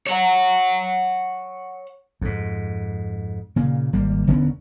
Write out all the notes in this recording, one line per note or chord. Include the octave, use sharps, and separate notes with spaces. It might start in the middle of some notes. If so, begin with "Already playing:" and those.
C#5 F#5
F2 G#2
A#2 C#3 A#3
G#1 G3 A#3
E1 D3 B3 C#4